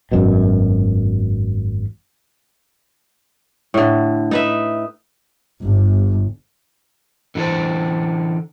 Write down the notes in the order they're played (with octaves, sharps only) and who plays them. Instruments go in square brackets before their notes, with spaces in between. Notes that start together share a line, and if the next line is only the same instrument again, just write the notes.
[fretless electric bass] G#1 F#2 B2
[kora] A2 D3
D#4 B4 E5
[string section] G1
[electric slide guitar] D3 E3 F4 A4 C5